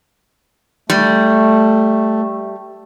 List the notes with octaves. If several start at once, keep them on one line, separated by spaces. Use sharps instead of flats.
G3 A3